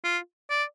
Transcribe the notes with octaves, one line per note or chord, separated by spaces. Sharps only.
F4
D5